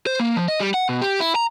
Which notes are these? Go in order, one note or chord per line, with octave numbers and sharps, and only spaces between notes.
C5
A#3
F3
D#5
G3
F#5
B2
G4
E4
A#5